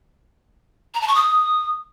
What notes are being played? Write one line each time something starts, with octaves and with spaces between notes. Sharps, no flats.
A#5
A5
C#6
D#6